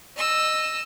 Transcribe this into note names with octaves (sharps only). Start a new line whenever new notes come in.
D#5 E6